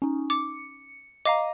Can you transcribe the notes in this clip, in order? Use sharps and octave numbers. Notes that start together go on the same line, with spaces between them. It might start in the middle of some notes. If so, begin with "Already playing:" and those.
C#4 D#4
D6 C#7
D#5 F5 A#5 D6